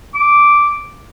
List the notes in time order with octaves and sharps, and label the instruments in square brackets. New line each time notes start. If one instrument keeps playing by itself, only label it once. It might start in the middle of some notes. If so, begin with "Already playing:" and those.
[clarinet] D6